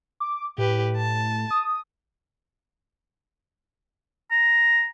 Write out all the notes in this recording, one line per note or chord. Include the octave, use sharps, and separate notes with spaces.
D6
A2 G4 B4
A5
D#6
A#5